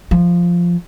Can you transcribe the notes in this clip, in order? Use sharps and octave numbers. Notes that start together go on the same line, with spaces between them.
F3